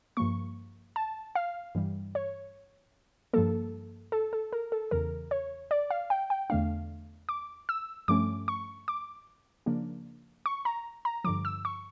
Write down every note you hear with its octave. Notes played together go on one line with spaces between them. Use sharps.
G2 F3 A#3 C#6
A5
F5
G2 E3 G3
C#5
G2 F3 A#3 A4
A4
A4
A#4
A4
E2 C#3 E3 A#4
C#5
D5
F5
G5
G5
E2 D3 A3 D4 F5
D6
E6
G2 F3 A3 C#4 D6
C#6
D6
C#3 F3 A#3 D4
C#6
A#5
A#5
G2 D3 F3 D6
E6
C#6